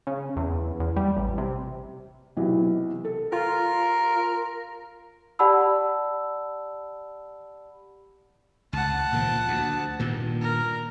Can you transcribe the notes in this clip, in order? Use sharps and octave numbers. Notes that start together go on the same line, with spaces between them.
C#3
E2
E2
G3
A1
C3
B1 C3 E3
A4
F4 A#4
G4 D5 F#5 A5 B5 E6
C#2 F#5 A5
A#2 D#3 F3
D2
G2 A#2 D#3
A#4